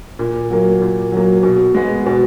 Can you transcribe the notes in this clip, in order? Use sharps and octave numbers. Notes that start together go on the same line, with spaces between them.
A#2
F#3 A#3
A#2
F#3 A#3
B2
G#3 B3
B2